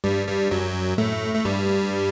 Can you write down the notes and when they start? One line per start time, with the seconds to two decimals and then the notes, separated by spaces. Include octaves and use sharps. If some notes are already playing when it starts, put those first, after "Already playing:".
0.04 G2 G3
0.27 G2 G3
0.51 F#2 F#3
0.98 A2 A3
1.34 A3
1.45 G2 G3